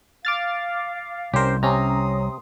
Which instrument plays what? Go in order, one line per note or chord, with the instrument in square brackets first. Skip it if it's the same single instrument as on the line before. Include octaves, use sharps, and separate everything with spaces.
[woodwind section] F5 [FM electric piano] D6 F6 A6
[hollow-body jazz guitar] C2 [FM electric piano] C#4 C5 [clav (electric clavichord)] G4 A#4
[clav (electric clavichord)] C3 [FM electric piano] C#4 A#5 [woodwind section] C6 D#6